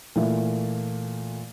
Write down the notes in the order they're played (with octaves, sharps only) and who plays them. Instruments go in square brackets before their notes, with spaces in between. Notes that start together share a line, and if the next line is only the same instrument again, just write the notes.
[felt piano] A#2 E3 A3